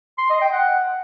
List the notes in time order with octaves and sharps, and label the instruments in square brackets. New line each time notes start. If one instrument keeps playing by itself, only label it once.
[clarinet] C6
D#5
G5
F#5